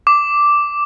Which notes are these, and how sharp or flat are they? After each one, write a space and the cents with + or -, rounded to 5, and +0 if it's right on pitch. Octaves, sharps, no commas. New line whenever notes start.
D6 -5